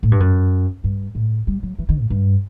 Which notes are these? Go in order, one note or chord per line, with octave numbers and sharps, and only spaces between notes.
A2
G2
F#2
G2
A2
G3
F#3
E3
D#3
A2
G2